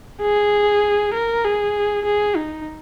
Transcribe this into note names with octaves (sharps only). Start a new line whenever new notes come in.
G#4
A#4
G#4
G#4
D#4